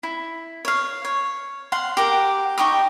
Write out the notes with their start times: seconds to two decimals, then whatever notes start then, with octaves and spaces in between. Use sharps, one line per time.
0.03 E4
0.65 C#5 F5
1.05 C#5
1.72 F5 F#5 C6
1.97 G4 A#4 F#5
2.58 D#4 G4 C#6 D#6